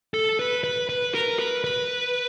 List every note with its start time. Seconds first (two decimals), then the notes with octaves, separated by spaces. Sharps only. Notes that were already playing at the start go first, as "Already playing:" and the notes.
0.14 A4
0.39 B4
0.64 B4
0.89 B4
1.14 A#4
1.39 B4
1.64 B4